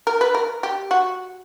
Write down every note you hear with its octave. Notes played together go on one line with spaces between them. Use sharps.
A#4
B4
A#4
G4
F#4